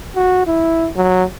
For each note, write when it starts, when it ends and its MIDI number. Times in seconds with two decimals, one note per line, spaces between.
0.16 0.45 66
0.47 0.89 64
0.96 1.24 54